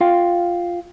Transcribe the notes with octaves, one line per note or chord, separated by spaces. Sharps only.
F4 F5 G5